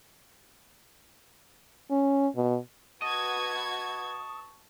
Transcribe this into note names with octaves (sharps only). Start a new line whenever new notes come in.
C#4
B2
F#4 B4 D#5 A5 C#6 G#6